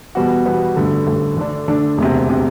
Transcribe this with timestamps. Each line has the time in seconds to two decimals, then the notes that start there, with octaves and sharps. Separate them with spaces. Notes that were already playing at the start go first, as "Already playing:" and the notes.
0.15 E2 B2 G3 B3 F#4
0.45 E2 B2 G3 B3 F#4
0.76 A1 G2 D3 A3
1.06 A1 G2 D3 A3
1.37 D3 A3 D4
1.68 D3 A3 D4
1.98 E1 D2 C3
2.30 C3